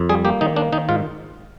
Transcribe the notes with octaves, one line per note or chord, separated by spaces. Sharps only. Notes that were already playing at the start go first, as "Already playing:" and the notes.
Already playing: F2
G3 G#4
A#3 G4
D#3 D#4
A#3 D4
D#3 D#4
G#2 F4